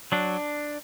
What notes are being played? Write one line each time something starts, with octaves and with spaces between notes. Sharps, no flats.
F#3 D4